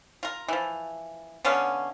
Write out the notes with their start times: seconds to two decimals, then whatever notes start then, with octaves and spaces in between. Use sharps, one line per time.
0.23 F4 A#4
0.48 E3 F3
1.45 D3 B3 C#4 F5